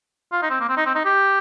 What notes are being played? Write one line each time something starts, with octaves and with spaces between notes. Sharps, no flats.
F4
D#4
C4
A#3
C4
D#4
C4
D#4
G4